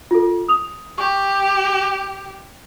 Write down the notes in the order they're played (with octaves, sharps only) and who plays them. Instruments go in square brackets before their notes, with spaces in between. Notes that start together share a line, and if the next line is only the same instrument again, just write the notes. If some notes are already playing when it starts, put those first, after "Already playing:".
[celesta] F4 A4
D#6 F7
[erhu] G4 [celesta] C#6